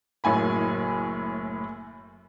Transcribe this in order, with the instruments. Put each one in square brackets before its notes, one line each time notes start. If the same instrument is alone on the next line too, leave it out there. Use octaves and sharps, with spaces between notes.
[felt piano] F#1 F#2 A2 G#5 B5